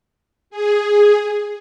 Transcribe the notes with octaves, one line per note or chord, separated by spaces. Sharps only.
G#4